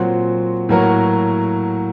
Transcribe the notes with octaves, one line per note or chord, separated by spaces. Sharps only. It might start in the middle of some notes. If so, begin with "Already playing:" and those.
Already playing: A#2 F#3 C4 F#4
A2 F#3 A#3 F#4 A#4